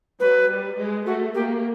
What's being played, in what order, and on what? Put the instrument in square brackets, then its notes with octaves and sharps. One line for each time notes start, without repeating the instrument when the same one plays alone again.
[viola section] F#3 [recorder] B4
[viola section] G3
G#3
[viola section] A3 [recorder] F#4
[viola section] A#3 [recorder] G4